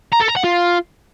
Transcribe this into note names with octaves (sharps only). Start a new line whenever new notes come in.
A#5
A4
A#5
F#5
F4